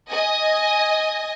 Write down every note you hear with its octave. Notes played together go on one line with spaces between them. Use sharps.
D#5 G#5